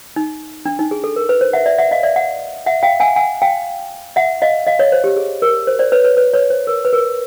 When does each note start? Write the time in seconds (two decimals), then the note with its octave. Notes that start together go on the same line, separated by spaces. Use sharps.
0.16 D#4
0.66 D4
0.79 D#4
0.91 G#4
1.04 A4
1.16 A#4
1.29 B4
1.41 C5
1.53 E5 F#5
1.66 D5 E5
1.78 E5 F#5
1.91 D#5 F5
2.03 D5 E5
2.16 E5 F#5
2.66 E5 F#5
2.83 F5 G5
3.00 F#5 G#5
3.16 F#5 G#5
3.42 F5 G5
4.16 E5 F#5
4.42 D#5 F5
4.67 D#5 F5
4.79 C#5 D#5
4.92 C5
5.04 G4
5.16 G#4
5.42 A#4
5.67 C5
5.79 C5 D5
5.92 B4 C#5
6.04 B4 C#5
6.17 B4
6.34 B4 C#5
6.50 C5
6.67 A#4
6.85 B4
6.93 A#4